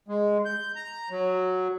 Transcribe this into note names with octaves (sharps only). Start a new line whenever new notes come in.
G#3
G6
A#5
F#3